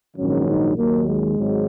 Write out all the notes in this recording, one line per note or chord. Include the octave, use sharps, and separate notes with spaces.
A#1 G#2 D#3 F#3 C#4
D#4
D#2 D#3 F#3 A#3
G#3
G#1 G#2 F#3